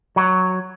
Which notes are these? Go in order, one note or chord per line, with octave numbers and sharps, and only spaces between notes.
F#3